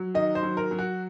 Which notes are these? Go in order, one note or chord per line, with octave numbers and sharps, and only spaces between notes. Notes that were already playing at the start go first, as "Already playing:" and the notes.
Already playing: F#3
D#3 D#5
C5
F#3
A#4
F#3
F#4